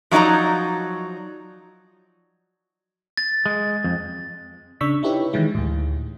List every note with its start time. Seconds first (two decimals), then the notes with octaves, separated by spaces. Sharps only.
0.11 F3 F#3 D#4 D5 A#5
3.17 A6
3.46 G#3
3.84 F2
4.81 C#3 D4 C#6 E6 B6
5.03 D#4 E4 G4 B4 C#5
5.33 D#3 E3 G#3 E4
5.55 D2 A2